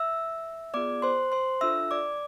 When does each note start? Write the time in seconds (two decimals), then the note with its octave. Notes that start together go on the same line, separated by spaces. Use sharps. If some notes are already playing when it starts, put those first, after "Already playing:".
Already playing: E5 E6
0.74 B3 F4 G#4 D5 D6
1.02 C5 C6
1.32 C5 C6
1.61 D4 F4 A4 E5 E6
1.91 D5 D6